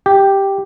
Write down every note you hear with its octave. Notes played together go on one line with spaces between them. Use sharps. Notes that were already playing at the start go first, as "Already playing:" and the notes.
G4